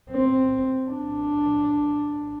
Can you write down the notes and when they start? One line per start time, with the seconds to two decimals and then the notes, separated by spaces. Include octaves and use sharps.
0.11 C4
0.90 D4